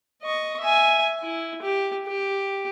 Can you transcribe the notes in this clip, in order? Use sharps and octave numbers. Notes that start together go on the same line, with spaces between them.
D#5 C#6
E5 G#5
E4
G4
G4